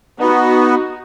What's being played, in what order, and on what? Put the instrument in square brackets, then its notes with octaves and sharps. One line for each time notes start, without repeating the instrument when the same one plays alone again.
[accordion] B3 [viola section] D#4 F#4